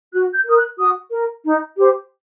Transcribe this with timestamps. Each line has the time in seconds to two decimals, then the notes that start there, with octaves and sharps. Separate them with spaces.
0.13 F#4 F#6
0.34 G6
0.46 A#4 D#6
0.57 F#6
0.79 F#4 D#6
1.12 A#4
1.45 D#4
1.77 G4 C5